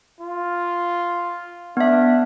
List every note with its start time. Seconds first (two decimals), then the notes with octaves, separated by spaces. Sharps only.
0.20 F4
1.77 B3 D4 E5